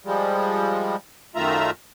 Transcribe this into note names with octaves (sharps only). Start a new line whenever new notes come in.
F3 G3 G#3
F#2 D#3 A3 F4 E5 A#5